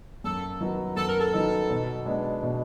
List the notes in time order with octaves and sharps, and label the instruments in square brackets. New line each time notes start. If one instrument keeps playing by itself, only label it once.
[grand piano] F#2 [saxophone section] A4
[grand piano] D#3 F#3 B3 D#4
[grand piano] F#2 [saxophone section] A4
[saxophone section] A#4
A4
[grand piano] D#3 F#3 B3 D#4
B2
G#3 B3 D4
B2